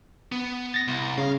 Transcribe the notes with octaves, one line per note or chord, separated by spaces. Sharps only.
B3
A6 A#6
C2
C#3 F5